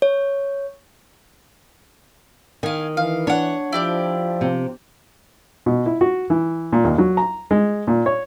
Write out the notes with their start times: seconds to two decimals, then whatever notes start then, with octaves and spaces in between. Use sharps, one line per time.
0.02 C#5
2.63 D#3 F5 G#5
2.97 E3 F5
3.27 D4 C#5 F#5
3.72 F3 E4 G4 D5
4.41 C3
5.66 B2
5.86 E4
6.01 F#4
6.30 E3
6.73 A#2
6.84 D#2
6.98 F#3
7.17 A#5
7.51 G#3
7.87 A#2
8.06 C#5